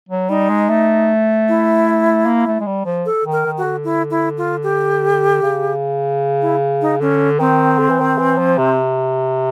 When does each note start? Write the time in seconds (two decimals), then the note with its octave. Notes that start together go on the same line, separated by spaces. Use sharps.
0.09 F#3
0.29 G3 D#4
0.49 G#3
0.69 A3
1.48 E4
2.26 A#3
2.47 A3
2.61 G#3
2.66 G3
2.85 F3
3.06 A4
3.25 D#3
3.32 A#4
3.46 D#3
3.58 F#4
3.64 D3
3.84 E4
4.11 E4
4.38 F4
4.63 G4
5.43 C#3
6.42 E4
6.81 D#4
7.00 D3 C#4
7.40 D#3 C4
7.79 D3
7.89 E3
8.00 D#3
8.18 E3
8.38 F3
8.58 C3